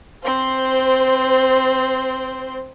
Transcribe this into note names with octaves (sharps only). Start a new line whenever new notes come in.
C4 C5